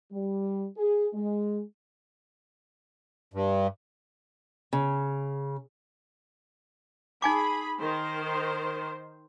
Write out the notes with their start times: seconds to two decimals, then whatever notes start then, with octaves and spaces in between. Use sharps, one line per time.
0.12 G3
0.77 G#4
1.14 G#3
3.34 G2
4.73 C#3
7.22 D#4 G#4 G#5 B5 D6
7.81 D#3 C5